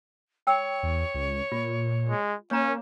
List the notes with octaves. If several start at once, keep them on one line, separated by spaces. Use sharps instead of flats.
C#5 G5 E6
E2
C#2
A#2 F4
G#3
A#3 C#4 C#5 A#5